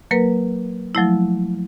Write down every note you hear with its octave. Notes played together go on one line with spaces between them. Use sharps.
F#3 A#3 A#4 B4
F3 F#3 A3 E4